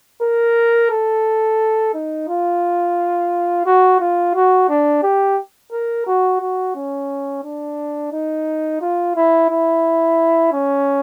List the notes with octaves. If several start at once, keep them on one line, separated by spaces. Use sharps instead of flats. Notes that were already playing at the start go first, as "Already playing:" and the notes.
A#4
A4
D#4
F4
F#4
F4
F#4
D4
G4
A#4
F#4
F#4
C#4
D4
D#4
F4
E4
E4
C#4